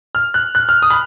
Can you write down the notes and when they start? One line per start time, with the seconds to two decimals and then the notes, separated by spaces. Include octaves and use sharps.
0.15 F6
0.34 F#6
0.55 F#6
0.69 F6
0.82 D#6
0.90 B5